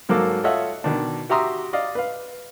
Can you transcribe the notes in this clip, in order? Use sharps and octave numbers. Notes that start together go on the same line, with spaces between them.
G#2 F#3 A#3 A4 D6
F4 A4 C#5 D#5 E5 F#5
B2 D#3 D4
F#4 G4 E5 A#5 C6 D#6
D5 D#5 F5
B4 F5